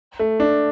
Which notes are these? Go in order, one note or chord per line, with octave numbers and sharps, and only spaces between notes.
A3
D4